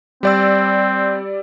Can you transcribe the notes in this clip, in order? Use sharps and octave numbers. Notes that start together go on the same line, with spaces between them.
G3 C4 D5 E6